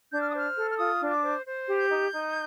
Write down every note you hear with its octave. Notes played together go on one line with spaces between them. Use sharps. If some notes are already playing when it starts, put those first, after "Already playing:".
D4 G6
F6
D#6
C5
F6
A4
F6
F4 D#6
D4
D6
C5
C5
G4
G6
D#4
D#4